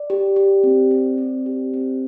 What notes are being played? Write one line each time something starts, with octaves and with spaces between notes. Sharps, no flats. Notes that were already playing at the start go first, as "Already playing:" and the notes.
Already playing: D5
G4
G4
C4
C4
C4
G4
C4